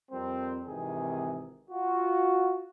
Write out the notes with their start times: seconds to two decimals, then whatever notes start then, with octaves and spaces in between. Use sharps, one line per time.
0.11 F2 G3 C4 A#4 C5
0.67 G#1 C3 D#3 E3 G#4
1.70 F4 F#4